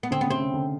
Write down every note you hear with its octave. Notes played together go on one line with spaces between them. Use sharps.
B3
D3 C4
C#3 B3
C3 C4
C#3
D3